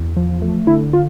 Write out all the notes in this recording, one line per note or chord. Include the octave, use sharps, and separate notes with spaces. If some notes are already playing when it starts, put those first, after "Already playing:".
Already playing: E2
F3
A3
D3 E4
F4